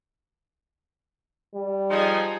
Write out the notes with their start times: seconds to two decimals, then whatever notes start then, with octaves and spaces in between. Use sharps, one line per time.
1.55 G3
1.90 F3 D#4 G#4